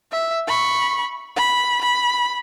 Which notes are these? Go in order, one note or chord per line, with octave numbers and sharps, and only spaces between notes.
E5
B5 C#6
B5
B5